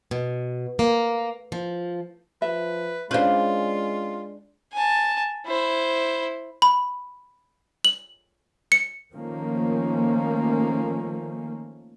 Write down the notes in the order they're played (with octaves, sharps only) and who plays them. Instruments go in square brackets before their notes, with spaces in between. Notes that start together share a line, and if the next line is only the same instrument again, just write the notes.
[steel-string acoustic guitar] B2
A#3
F3
[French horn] F3 [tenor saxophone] B4 [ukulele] E5
[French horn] G#3 [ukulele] C#4 C5 F5 [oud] D4 B4 [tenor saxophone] F4
[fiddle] G#5 A5
E4 C5
[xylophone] B5
F#7
C#7
[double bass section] D#3 F3 A3 A#3 C#4